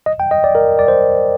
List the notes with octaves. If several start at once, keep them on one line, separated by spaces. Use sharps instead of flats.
D#5
G5
D#5
D5
A#4
D5
C5